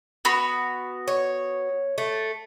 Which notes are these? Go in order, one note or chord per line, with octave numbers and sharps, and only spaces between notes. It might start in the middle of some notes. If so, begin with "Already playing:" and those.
B3 F#4 B5
C#5
A3